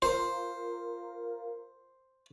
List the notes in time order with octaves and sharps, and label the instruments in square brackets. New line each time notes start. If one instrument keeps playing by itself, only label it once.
[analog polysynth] F4 A#4 [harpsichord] C5